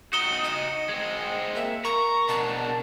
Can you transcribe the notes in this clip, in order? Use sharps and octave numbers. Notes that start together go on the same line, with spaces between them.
D#4 F#4 D#6 C#7 E7 G7
D#5
G#3 C4
A#3 E5
A#4 A#5 C#6
B2 D4 A5